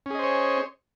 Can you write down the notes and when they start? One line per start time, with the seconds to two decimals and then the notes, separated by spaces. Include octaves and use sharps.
0.06 C#4
0.10 G#4
0.15 D#5
0.19 C5
0.24 C#5